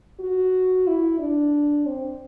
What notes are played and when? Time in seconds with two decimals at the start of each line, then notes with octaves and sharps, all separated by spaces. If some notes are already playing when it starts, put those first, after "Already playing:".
0.20 F#4
0.87 E4
1.19 D4
1.86 C4